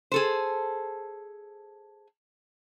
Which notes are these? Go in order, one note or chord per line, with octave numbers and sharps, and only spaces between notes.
G#4 A4 C5